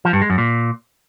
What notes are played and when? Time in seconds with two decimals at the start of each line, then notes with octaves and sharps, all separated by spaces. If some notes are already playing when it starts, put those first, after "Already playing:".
0.05 F3
0.13 G2
0.21 G#3
0.30 F#2
0.38 A#2